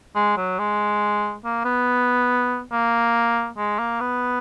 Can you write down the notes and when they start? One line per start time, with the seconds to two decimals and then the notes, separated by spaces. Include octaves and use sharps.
0.15 G#3
0.37 F#3
0.59 G#3
1.45 A#3
1.65 B3
2.72 A#3
3.57 G#3
3.79 A#3
4.00 B3